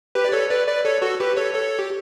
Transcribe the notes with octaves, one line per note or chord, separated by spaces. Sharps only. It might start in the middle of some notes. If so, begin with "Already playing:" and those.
G4 B4
D5
A4 C#5
B4 D5
B4 D5
A4 C#5
F#4 A4
G4 B4
A4 C#5
A4 C#5
G4